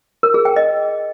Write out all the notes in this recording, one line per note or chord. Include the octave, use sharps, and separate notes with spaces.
A#4
G#4
G5
D#5